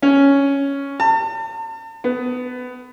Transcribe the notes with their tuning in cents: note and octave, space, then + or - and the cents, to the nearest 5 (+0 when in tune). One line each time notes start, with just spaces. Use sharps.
C#4 +5
A5 +40
B3 +20